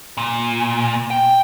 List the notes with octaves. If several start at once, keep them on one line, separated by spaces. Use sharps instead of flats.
A#2
G5